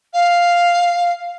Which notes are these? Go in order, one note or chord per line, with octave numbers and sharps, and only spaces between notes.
F5